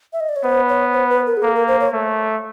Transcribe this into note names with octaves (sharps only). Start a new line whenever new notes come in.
E5
D#5
D5
C#5
B3 C5
C#5
C5
B4
A#4
G#4
A#3 A4
A#4
C5
C#5
A3